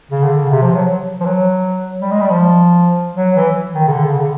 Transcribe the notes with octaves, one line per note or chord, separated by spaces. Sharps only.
C#3
D3
C#3
C3
F3
F#3
F3
F#3
G3
G#3
G3
F3
F#3
E3
D#3
C#3
D3
C#3
D3